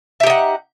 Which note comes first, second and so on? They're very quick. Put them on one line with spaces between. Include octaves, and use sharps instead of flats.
E5 G4 D#4 F#5